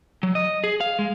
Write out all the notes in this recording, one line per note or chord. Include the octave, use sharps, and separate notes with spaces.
F#3
D#5
G#4
F5
G#3